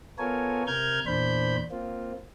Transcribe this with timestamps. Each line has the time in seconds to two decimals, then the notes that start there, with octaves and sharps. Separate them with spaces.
0.18 B3 F4 A4 A#4 C#5 G#5
0.67 C3 A#4 F6 G6 G#6
1.07 E2 A#2 D4 C5 B5 G6
1.71 A#3 C4 F4